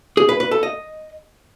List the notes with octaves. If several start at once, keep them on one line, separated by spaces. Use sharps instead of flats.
G#4
B4
B4
A4
D#5